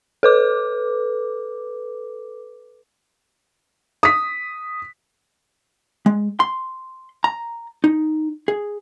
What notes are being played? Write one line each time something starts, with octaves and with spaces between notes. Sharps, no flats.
A4 B4 D6
D#6 B6
G#3
C6
A#5
D#4
G#4